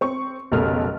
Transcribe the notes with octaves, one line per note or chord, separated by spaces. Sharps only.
C4 C#6
F1 B1 C#3 A3 A#4 F6